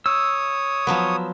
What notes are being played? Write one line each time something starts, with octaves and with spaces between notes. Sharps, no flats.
C#5 D#6 E6
F3 F#3 B3